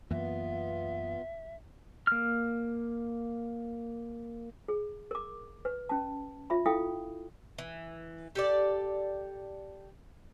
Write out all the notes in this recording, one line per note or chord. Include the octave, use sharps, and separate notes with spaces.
F#2 E3 A#3 B3 F4 E5
A#3 F6
G#4
A#4 D6
B4
C#4 A5
F4 E5 B5
E4 A4 F5 G5 D#6
E3
G4 A4 D5